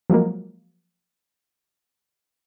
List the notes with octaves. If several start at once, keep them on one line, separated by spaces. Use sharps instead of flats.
F3 F#3 G#3 A#3